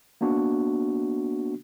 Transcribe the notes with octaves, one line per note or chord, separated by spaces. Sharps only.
A#3 B3 D4 F#4